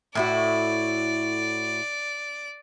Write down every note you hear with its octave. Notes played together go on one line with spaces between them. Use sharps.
A2 E4 F#4 D5